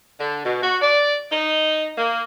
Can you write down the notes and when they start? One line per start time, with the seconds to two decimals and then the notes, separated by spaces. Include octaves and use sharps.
0.20 D3
0.45 B2
0.63 F#4
0.81 D5
1.32 D#4
1.97 A#3